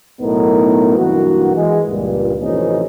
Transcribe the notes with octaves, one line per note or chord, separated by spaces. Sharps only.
B1 A2 B3 D#4 A#4
B1 G2 E3 A#3 F#4
E3 G#3
C#2 G2 A#2
A1 F2 C3 E3 C#4 D#4